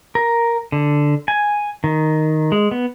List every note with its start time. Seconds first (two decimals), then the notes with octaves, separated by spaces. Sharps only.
0.15 A#4
0.72 D3
1.28 G#5
1.84 D#3
2.52 G#3
2.71 B3